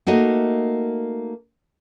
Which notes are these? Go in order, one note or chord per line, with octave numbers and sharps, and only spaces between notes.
A3 A#3 D#4 F#4 D#5